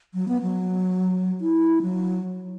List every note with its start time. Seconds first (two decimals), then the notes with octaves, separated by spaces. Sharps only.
0.14 F#3
0.28 B3
0.42 F#3
1.41 E4
1.82 F#3